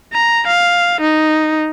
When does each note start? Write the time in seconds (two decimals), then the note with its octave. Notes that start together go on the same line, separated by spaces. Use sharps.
0.13 A#5
0.47 F5
1.01 D#4